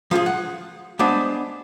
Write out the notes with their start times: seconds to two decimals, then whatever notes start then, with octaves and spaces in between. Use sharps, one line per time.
0.11 F3 F4 G4 G#4
0.26 F#5
0.99 G#3 B3 D4 C5 D5